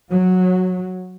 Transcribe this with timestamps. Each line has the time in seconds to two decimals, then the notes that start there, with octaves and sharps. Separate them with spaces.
0.11 F#3